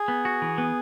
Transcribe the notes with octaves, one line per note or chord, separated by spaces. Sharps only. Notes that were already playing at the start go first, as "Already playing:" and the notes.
Already playing: G#4
B3
F#4
E3
B3